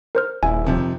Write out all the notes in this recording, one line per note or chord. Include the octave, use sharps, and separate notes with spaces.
A#4 C5 F6
D#1 E4 G#5
F2 C3 D#3